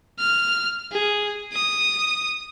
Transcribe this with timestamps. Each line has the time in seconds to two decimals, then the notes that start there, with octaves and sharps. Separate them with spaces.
0.19 F6
0.92 G#4
1.53 D#6